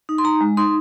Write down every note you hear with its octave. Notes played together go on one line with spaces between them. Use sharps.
D#4
C6
D#4 A#5
G#3
D#4 C6